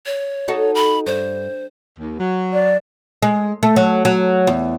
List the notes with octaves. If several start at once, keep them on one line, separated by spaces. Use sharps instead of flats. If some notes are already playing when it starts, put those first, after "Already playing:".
C#5
D#4 F#4 A4
B5
G2 C5
D#2
F#3
D5
G#3
A3
F#3
F#3
E2